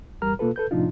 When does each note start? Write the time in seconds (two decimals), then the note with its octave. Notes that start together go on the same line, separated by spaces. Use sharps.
0.22 E2 G3 A#4 A#5 F6
0.39 B2 A#3 F4 A4 B4
0.56 A4 B4 G6
0.71 A2 C3 F3 D4 D#4 F4